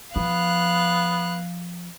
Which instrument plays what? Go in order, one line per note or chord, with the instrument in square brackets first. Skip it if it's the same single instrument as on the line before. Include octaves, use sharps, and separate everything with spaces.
[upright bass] F3 [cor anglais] B3 [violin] F5 F#6